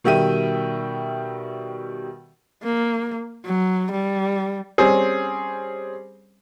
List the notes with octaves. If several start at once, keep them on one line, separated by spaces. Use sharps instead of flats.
B2 D#3 G3 E5 G5 D#7
A#3
F#3
G3
G3 C4 C#4 G#4